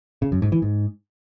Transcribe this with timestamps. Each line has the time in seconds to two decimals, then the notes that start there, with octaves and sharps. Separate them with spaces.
0.22 C#3
0.32 F#2
0.42 G#2
0.52 E3
0.62 G#2